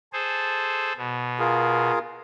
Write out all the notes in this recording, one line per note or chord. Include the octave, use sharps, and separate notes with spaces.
G#4 A4 C5
B2
F4 G#4 A#4